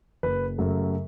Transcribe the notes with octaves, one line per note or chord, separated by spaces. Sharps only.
F#1 B4
F#2 C#3 F#3 A3